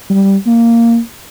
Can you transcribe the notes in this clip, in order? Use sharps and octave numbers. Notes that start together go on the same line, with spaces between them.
G3
A#3